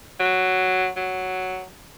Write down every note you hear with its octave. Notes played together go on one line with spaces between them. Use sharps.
F#3
F#3